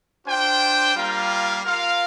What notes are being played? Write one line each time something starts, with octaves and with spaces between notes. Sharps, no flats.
D4 F4 C5 G5
G3 A#3 F4 A#4 F5
F4 A#4 F5